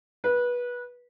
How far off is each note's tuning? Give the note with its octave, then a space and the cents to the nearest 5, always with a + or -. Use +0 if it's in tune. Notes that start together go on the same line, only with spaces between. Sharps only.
B4 -20